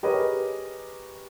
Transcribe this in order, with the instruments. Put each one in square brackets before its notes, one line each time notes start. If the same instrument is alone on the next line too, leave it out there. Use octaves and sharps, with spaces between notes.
[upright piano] G4 G#4 A#4 B4 C#5 D#5